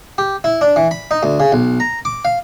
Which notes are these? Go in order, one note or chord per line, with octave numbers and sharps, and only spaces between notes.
G4
E4
D4
E3
B5
D#4
D2
C#3
B1
A#5
D6
F5